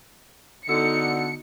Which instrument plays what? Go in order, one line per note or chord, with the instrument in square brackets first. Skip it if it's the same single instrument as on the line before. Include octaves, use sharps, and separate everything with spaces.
[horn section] D3 [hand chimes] B3 F#4 E6 [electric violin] D#4 [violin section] C#7